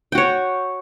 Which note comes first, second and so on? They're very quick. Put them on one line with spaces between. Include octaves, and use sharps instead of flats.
G5 F#4 C#5